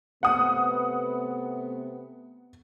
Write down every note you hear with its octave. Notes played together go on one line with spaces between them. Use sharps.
C3 A3 B3 F#5 D#6